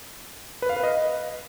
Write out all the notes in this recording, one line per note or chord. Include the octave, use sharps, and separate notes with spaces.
B4
F5
B4
D#5